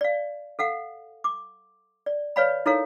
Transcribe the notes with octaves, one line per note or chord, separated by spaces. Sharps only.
D5 F5
A4 F5 F#5
D6
D5
B4 C#5 D5 F5 G#5 B5
D#4 E4 A4 A#4 C#5 F5